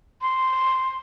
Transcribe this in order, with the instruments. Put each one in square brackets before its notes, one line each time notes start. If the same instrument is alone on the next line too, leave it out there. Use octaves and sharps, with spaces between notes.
[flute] C6